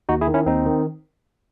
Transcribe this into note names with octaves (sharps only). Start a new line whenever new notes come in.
D#2 D#4 F#4
E4 G#4
D#3
C#4 E4
D#2 C4 D#4
D#3